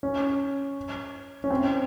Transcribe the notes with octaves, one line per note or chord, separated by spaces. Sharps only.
C#4
C#4
C4